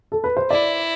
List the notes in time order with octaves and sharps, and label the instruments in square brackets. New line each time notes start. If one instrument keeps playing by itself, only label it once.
[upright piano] A4
B4
C5
[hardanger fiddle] E4 [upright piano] D5